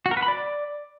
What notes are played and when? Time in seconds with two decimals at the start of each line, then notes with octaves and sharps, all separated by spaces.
0.06 F#4
0.11 A#4
0.17 B4
0.22 B5
0.28 D5